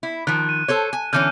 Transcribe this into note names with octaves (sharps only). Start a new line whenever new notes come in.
E4
D#3 F3 F#6
D#7
A4 C5 C#5
G#5
D3 E3 C#4 F6 G6